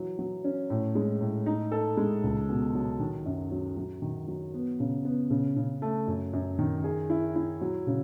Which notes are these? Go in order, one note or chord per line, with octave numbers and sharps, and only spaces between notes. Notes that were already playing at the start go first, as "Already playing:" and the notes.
Already playing: E3 F#3
F#3
C#4
A2
G#3
A2
D#4
A4
G#3
C#2
B2
F#3
D#3
F#2
F#3
F#3
D#3
F#3
B3
C#3
B3
C#3
C#3
A3
F#2
F#2
D#3
G#4
E4
E4
F#3
C#3